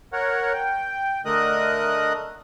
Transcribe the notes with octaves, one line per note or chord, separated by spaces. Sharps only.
A#4 C#5 F#5
G5
D3 A3 A#4 D#5 D#6 F#6